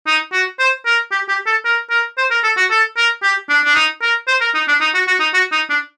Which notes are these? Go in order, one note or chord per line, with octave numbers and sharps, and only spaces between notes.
D#4
F#4
C5
A#4
G4
G4
A4
A#4
A#4
C5
A#4
A4
F#4
A4
A#4
G4
D4
D4
D#4
A#4
C5
A#4
D#4
D4
D#4
F#4
F#4
D#4
F#4
D#4
D4